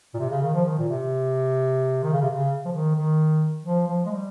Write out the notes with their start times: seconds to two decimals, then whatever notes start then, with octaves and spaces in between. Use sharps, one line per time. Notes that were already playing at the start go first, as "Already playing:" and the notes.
0.14 A#2
0.19 C3
0.30 C#3
0.42 D#3
0.54 F3
0.65 D#3
0.78 A#2
0.89 C3
2.03 D#3
2.12 C#3
2.22 C3
2.31 C#3
2.65 F3
2.72 D#3
2.95 D#3
3.64 F3
3.87 F3
4.06 G#3
4.11 G3